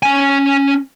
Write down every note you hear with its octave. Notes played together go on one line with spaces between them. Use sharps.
C#4 G#5